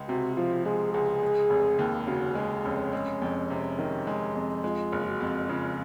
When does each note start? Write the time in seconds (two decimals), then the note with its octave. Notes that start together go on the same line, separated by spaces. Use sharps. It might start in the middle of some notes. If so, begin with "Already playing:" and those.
Already playing: C#2 G#3
0.08 C3 F#4
0.37 F3 F4
0.65 G#3 G#4
0.94 C#2 G#4
1.23 G#3
1.50 F1
1.79 D#2
2.07 C#3 F#4
2.35 G#3
2.65 F1 C#4
2.93 G#3
3.22 F2
3.50 C3
3.79 D#3
4.07 G#3
4.35 F2
4.64 G#3 F4
4.92 F#1
5.06 F#4
5.21 F2
5.49 C#3 F4